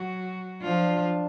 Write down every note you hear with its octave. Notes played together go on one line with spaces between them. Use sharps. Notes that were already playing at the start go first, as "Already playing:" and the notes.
Already playing: F#3 F#4
F3 D4 F4